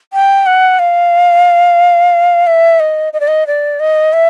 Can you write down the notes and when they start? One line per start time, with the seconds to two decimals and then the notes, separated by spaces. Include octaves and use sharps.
0.13 G5
0.46 F#5
0.79 F5
2.47 E5
2.80 D#5
3.13 D#5
3.20 D5
3.28 D#5
3.47 D5
3.80 D#5
4.13 E5